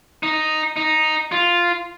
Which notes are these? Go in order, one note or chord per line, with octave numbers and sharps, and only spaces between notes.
D#4
D#4
F4